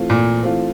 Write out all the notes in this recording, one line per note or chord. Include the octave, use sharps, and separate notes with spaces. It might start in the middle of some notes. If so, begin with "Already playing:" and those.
Already playing: E3 A3 C4 F4
A#2
E3 A3 C4 F4